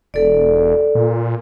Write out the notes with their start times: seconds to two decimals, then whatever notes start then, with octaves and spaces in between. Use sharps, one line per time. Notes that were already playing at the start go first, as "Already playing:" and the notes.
0.14 E1 A4 D5
0.95 A#2